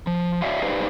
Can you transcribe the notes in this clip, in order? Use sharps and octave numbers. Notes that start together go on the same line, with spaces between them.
F3
F#4 C#5 D5 E5 F5
D#4 G4 B4 C5 D5 F5